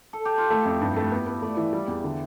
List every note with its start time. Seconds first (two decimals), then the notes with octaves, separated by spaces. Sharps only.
0.13 A4
0.25 G4
0.38 F4
0.50 A3 E4
0.65 F2
0.81 G2
0.96 A3 B4
1.12 B3
1.27 B3
1.42 A3 D5
1.57 E3 E5
1.73 G3
1.88 E2
2.04 D3